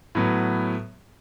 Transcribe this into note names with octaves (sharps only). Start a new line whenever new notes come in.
A2 F#3 B3